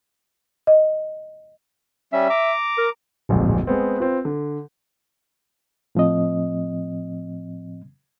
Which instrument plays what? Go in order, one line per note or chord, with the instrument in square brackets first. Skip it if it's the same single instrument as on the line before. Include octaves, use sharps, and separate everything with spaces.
[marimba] D#5
[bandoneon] G3 C#4 [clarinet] E5
[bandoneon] A#5 D6
[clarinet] A#4
[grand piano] D1 A#1 F2 G#2
G#3 B3 C4
C4 F4 B4
D3
[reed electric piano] A2 F3 C4 D#5